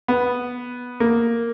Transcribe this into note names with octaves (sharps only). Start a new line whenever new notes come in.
B3
A#3